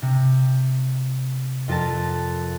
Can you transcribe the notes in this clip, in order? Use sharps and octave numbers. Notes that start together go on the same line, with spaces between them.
C3
F2 F4 A#4 A5